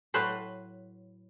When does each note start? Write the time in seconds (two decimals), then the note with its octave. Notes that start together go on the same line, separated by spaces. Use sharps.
0.14 A2 F#3 B4 C5